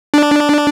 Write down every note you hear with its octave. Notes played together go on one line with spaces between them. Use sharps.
D4